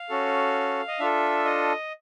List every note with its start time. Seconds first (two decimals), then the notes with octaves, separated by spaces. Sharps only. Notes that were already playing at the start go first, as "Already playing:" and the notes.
Already playing: F5
0.09 C#4 F#4 A4
0.88 D#5
0.99 D4 F4 A4 E5
1.45 D#5